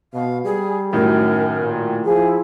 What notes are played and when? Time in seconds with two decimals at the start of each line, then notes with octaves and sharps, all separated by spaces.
0.14 B2 F5
0.45 G3 G#4
0.93 F#2 A2 D#3 F#3 A#4
1.62 A#2
2.06 F3 E4 G#4